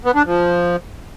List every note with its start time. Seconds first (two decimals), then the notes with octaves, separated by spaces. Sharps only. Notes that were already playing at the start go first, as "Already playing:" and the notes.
0.05 B3
0.15 D4
0.25 F3